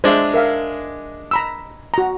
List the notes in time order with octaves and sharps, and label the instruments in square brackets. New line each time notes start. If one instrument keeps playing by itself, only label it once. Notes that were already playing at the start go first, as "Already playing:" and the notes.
[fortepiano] G#3 D4 [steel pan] C5 E5
[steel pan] A#4 E5 F5
A#5 B5 E6
F#4 A#5